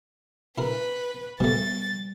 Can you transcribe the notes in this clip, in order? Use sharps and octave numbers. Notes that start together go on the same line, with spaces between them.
E4 A#4 B4
B2 G3 A3 A6